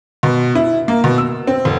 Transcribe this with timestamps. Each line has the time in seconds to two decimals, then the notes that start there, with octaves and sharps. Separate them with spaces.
0.23 B2
0.55 E4
0.88 A#3
1.04 B2
1.18 E6
1.47 C4
1.65 F1